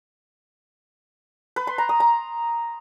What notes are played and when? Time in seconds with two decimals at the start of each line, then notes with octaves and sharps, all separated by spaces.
1.56 B4
1.67 C6
1.78 A#5
1.89 D#6
2.00 A#5